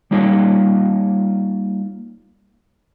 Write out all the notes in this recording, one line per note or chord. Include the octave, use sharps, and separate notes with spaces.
G3 A#3 D#4 F4 C#5